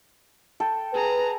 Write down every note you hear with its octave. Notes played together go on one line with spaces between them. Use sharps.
A4 G5
G#4 B4 A#5